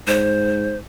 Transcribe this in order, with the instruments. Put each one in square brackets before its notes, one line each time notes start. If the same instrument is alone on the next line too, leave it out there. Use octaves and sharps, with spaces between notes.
[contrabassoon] G#2 [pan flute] C5